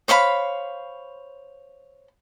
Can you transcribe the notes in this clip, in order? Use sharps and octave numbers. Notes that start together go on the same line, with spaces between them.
C5 C#5 F5 B5